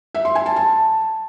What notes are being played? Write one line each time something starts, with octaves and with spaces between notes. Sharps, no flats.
E5
C6
G#5
A5
A5